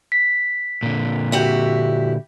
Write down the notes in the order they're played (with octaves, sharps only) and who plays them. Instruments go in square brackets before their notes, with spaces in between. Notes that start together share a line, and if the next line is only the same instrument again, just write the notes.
[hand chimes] B6
[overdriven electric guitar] A#2 D3
[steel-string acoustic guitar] E4 F#4 G4